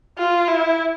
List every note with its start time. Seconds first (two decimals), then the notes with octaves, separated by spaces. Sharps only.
0.18 F4
0.48 E4